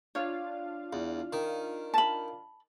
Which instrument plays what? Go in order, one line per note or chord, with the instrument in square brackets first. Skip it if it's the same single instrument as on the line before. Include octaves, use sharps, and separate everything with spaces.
[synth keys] D4 F4 F5 [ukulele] C#5
[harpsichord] E2
D#3
[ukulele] A5 B5